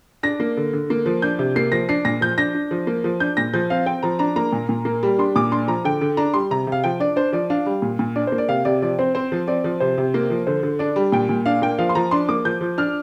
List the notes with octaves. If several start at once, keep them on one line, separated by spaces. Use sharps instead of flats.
D4 A#6
A#3
D3
D3
A#3
F3
D4 G6
C3
A#3 C7
F3 A#6
D4 C7
A#2 A#6
F3 G6
D4 A#6
D4
F3
A#3
F3
D4 G6
A#2 A#6
F3 G6
C4 F5
C4 G5
F3 A#5
D4 A#5
A#3 A#5
A#2
A#2
A#3
G3
D4 C6
A#2 D6
D4 C6
F3 A#5
D3 G5
D3
D4 A#5
G3 C6
C3 A#5
C3
F5
F3 G5
D4 D5
D4 C5
F3 D5
D4 F5
G3
A#2
A#2
D4 D5
C5
A#3
D5
C3 F5
C3 D5
F3 D5
C4 C5
C4 C5
F3
C4 D5
F3
C3 C5
C3
A#3
F3
D3 C5
D3
D4 D5
G3
A#2 G5
A#2
D4 F5
A#3 G5
F3 F5
C6
F3 A#5
D4 C6
A#3 D6
F3 G6
F3
D4 F6